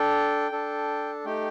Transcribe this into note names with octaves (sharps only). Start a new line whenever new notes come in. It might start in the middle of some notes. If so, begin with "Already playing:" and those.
Already playing: D4 A4 G5
D4 A4
A3 D#4 G4 G5